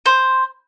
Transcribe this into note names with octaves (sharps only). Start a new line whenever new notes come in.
C5